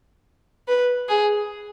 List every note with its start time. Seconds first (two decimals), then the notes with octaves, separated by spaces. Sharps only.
0.68 B4
1.09 G#4